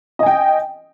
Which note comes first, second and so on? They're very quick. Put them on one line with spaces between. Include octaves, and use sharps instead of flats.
D#5 G#5 G5